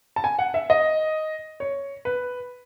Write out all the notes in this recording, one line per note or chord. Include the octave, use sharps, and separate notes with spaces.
A5
G#5
F#5
E5
D#5
C#5
B4